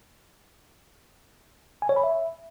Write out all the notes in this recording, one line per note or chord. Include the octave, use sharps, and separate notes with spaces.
G#5
C#5
B5
E5